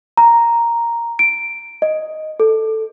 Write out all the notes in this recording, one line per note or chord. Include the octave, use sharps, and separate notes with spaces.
A#5
D7
D#5
A4